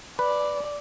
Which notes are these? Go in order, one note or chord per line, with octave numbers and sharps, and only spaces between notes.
B4 D5